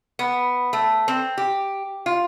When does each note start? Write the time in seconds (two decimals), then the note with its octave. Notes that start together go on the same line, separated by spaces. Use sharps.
0.19 B3
0.73 A3
1.08 C4
1.38 G4
2.06 F4